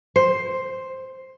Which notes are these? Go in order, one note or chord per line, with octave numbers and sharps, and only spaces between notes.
C5